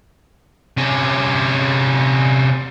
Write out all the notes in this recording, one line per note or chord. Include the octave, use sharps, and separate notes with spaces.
C3 C#4